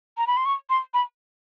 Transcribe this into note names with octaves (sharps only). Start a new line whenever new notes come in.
A#5
B5
C6
C#6
C6
B5